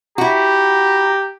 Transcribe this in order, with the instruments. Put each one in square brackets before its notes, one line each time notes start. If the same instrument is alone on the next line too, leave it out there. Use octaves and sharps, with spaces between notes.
[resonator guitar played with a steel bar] E4 F#4 [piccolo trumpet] G4 [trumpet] A#5